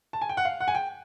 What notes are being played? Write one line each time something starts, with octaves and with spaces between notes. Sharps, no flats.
A5
G#5
G5
F#5
F5
F#5
G#5
G5